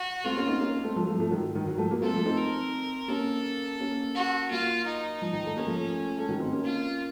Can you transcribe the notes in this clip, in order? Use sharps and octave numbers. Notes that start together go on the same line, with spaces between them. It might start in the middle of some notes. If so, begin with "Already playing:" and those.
Already playing: F#4
A3 C4 F4
A#3 C#4
C4 D#4
A#3 C#4
A3 C4
F3 A3
F#3
F3 A3
F3 A3
D#3 F#3
D#3
D#3 F#3
F3 A3
F#3 A#3
A3 C4 A4
F3 A3
C4 D#4
A#4
A#3 C#4 A4
A#3 C#4
F#4
F#3 A#3 F4
D#4
F3
D#3
A3
A#3 C#4
F3 A3
A3
D#3 F#3
C4 D#4
A#3 C#4
F4